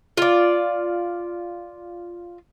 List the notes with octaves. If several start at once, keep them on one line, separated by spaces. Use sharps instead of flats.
F4 D5